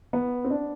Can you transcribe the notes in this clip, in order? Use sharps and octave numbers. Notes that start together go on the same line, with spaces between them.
B3
C4
D4